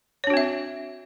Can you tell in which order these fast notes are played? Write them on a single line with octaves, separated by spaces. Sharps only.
C#5 D4 F#4 C4 E5